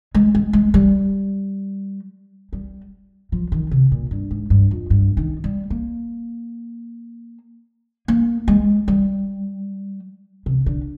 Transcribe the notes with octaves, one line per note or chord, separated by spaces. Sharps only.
G#3
G#3
G#3
G3
G3
F3
D#3
C3
A#2
G2
G#2
G2
F2
G2
D#3
G3
A#3
A#3
G#3
G3
C3
D3